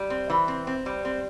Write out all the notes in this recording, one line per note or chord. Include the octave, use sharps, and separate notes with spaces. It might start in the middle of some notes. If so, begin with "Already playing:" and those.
Already playing: G3
C4
E3
C4
C4
G3
C4